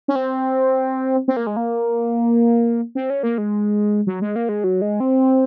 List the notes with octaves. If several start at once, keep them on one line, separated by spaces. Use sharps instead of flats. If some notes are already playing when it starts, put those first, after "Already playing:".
C#4
C4
C4
A#3
G#3
A#3
C4
C#4
A#3
G#3
F#3
G#3
A#3
G#3
F#3
G#3
C4